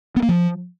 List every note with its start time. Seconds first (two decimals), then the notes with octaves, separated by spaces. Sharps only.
0.16 B3
0.23 A#3
0.29 F3